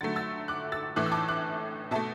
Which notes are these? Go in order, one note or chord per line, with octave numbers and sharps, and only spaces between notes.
D3 F#3 A3 A6
E6 A6
D6 F#6
E6 A6
A2 E3 A3 D6 F#6
E6
A5 D6
D6 F#6
B2 A3 E5 A5